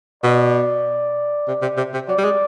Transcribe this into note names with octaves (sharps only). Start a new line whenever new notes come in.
B2 D5
C3
C3
C3
C3
F#3 D5
G3
G#3